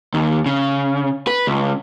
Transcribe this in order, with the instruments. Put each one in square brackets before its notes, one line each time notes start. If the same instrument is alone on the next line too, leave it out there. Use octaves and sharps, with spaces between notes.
[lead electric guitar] D#2
C#3
B4
C#2